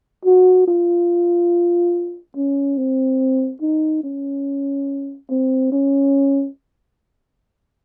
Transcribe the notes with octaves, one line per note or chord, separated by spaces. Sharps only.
F#4
F4
C#4
C4
D#4
C#4
C4
C#4